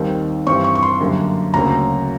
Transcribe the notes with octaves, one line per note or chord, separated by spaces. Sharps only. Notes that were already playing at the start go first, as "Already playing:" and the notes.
Already playing: D#2 D#3 G3 C4
G2 E3 G3 C4 C#6
C#6
C#6
C6
F#2 D3 G3 A#3
D2 C#3 F#3 A#3 A#5